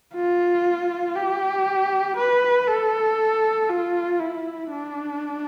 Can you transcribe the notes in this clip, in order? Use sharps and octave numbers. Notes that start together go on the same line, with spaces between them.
F4
G4
B4
A4
F4
E4
D4